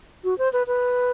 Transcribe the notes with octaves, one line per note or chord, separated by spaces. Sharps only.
F#4
C5
B4
B4